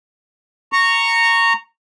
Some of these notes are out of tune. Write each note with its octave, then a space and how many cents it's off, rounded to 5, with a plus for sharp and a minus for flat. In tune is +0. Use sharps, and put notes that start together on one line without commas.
A#5 -15 C#6 +0